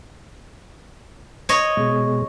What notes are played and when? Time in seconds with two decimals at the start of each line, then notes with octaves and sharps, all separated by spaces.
1.49 C#5 D#5
1.77 B2 G#3